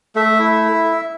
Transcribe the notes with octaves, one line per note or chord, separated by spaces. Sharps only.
A3 E5
E4